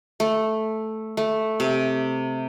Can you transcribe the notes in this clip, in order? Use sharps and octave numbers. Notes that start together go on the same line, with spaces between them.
A3
A3
C3